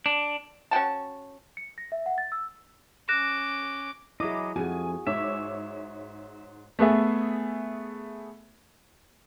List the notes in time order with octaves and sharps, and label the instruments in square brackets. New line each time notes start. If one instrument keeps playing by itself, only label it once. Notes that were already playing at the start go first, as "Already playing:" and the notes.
[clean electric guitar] D4
[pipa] C#4 F#4 G5 A5
[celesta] C#7
A#6
E5
F#5
A6
E6
[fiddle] C#4 D6 [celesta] F#6 A#6 E7
[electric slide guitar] F#3 D#5 [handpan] E4 G#4 [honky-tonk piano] D6
[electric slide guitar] F2 [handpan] F#4 G#4 [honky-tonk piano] G#5
[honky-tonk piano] G#2 C#5 D6 [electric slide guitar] E5
[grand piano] A3 B3 G#4 E5